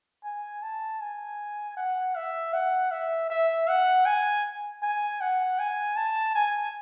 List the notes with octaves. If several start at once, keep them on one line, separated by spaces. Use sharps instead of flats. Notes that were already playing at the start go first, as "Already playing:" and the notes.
G#5
A5
G#5
F#5
E5
F#5
E5
E5
F#5
G#5
G#5
F#5
G#5
A5
G#5